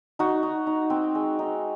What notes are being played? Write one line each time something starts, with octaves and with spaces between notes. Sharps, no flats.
D#4 F#4
D#4
D#4
C4
G#3
D#4